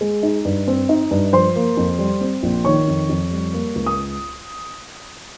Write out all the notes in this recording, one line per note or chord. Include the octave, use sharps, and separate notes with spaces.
G#3
D#4
G2
C4
D#4
G2
F3 C5 C6
A#3
F2
G3
C4
A#1
D#3 C#5 C#6
F2
F2
G3
A#3
C#2
D#6